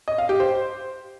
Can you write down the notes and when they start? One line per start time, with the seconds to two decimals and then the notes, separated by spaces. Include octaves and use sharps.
0.08 D#5
0.18 F5
0.29 G4
0.40 C5